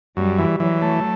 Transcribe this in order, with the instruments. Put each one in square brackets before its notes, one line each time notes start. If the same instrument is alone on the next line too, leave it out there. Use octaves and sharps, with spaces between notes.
[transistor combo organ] F#2 [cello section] G3
[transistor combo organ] E3
[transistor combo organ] E3 [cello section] F#3
[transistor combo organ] A3